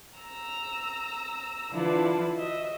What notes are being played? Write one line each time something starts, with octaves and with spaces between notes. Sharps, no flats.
A#5 E6
D3 E3 D4 E4 F4 B4
F#4 D#5 E5